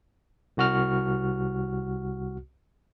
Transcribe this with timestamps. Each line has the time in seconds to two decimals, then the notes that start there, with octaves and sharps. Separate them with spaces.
0.57 C2 F#4 F6